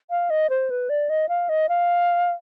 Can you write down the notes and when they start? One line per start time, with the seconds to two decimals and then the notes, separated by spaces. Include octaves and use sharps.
0.10 F5
0.30 D#5
0.50 C5
0.70 B4
0.89 D5
1.09 D#5
1.29 F5
1.49 D#5
1.69 F5